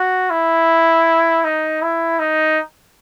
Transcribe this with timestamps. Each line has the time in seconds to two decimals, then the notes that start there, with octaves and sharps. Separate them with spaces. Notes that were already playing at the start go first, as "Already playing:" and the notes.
Already playing: F#4
0.30 E4
1.44 D#4
1.82 E4
2.19 D#4